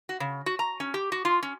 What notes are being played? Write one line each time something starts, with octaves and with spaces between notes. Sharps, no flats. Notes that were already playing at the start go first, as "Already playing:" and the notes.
F#4
C#3
F#4
A#5
C#4
G4
F#4
F4
C#4